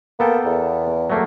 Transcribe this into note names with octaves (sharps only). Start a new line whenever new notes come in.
A#3 B3 A4 G5
E2
F#3 A3 A#3